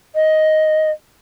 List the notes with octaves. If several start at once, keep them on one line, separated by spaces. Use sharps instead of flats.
D#5